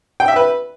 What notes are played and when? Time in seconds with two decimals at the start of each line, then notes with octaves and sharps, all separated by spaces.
0.20 G5
0.28 E5
0.36 B4